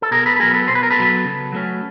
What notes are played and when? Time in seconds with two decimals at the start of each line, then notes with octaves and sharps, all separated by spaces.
0.02 A4
0.11 B2 G#4 A#4
0.26 A4 B4
0.36 B4
0.40 F#3 B3 G#4 A#4
0.54 A4 B4
0.68 B2 C5
0.75 B4
0.83 A#4
0.91 A4 B4
0.96 F#3 B3
1.25 C#3
1.52 F#3 A3 C#4